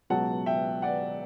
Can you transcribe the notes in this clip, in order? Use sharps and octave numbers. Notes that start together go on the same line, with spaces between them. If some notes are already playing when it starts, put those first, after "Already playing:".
C#2 B2 F#3 F#5 A5
E5 G5
D5 F#5